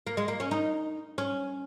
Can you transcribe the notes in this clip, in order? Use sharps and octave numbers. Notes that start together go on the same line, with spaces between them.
A#3
G#3
A#3
C#4
D#4
C#4